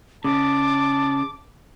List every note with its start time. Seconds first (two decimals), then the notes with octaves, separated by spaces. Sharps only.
0.25 C#3 A5 D6